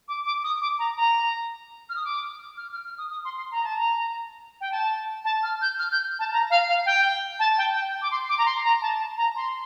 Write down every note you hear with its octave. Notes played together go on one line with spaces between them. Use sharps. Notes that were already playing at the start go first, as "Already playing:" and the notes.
D6
D6
D#6
D6
A#5
A#5
F6
D#6
D6
F6
F6
F6
D#6
D#6
C6
C6
A#5
A5
A#5
G5
A5
A5
F6
G6
F6
G6
A5
A#5
F5
F5
G5
A5
G5
G5
D6
C6
D6
A#5
C6
A#5
A5
A5
A#5
C6